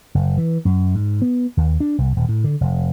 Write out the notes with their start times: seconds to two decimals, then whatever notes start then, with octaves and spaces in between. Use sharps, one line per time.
0.15 F#1
0.37 E3
0.65 F#2
0.95 G#2
1.22 B3
1.57 D#2
1.80 D4
1.98 C2
2.16 D#1
2.29 A2
2.44 D3
2.61 F1